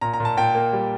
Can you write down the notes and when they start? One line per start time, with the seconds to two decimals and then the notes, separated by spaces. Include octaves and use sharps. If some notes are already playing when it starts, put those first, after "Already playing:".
0.01 A#2 A#5
0.14 A#5
0.20 A#2
0.25 A5
0.37 A#2 G5
0.55 A#3
0.73 G3